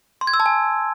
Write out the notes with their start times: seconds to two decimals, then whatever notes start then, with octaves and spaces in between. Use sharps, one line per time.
0.21 C6
0.27 G#6
0.33 E6
0.40 A5
0.46 G#5